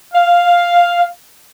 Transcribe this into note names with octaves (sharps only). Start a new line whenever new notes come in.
F5